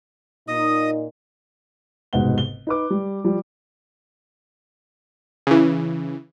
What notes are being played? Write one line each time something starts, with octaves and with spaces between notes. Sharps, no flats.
A#2 D#4 D#5 D#6
F1 G#2 B2 F#5 G7
G7
D#4 B4 D6
G3
F3 G3
C#3 E3